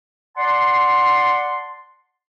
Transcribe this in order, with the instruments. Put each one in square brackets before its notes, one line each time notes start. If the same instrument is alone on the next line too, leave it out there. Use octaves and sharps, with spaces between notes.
[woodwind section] D5 F#5 A5 C6